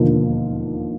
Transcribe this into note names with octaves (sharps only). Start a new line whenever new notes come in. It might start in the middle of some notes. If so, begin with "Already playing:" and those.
Already playing: E1 D#2 D3 F3 A#3